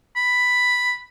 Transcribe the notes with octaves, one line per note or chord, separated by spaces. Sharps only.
B5